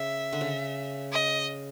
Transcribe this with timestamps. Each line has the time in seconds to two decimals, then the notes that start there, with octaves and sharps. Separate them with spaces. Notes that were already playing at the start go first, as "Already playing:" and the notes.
Already playing: C#3 E5
0.33 D3
0.41 C#3
1.13 D#5